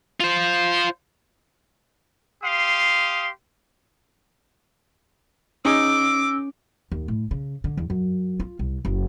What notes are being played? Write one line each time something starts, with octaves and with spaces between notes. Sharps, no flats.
F4 C5
G4 F5 C6 D#6
C#4 D#4 G#4 D6 E6
D#2
A2
C#3
D3
E2
F#2
F4
C2
F#1